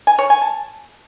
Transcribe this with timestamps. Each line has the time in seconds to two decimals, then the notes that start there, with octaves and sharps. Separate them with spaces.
0.07 G#5
0.18 C#5
0.30 G#5
0.41 A5